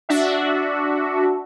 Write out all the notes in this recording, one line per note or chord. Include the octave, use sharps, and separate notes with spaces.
D4 F#4 E5